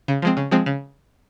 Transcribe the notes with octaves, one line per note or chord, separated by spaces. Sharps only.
C#3
F3 G#3 C4
C#3
F3 G#3 C4
C#3